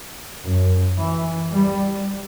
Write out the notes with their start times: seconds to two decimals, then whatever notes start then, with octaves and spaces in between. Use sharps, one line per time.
0.45 F#2
0.98 E3
1.52 G3